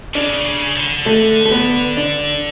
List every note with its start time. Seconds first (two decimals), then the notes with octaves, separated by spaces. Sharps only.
0.15 C#3 D4
0.45 C#3
0.76 D3
1.06 A3
1.45 A3
1.51 B3
1.97 D4